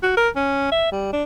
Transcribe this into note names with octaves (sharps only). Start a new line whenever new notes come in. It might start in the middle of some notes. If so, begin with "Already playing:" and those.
F#4
A#4
C#4
E5
G3
D4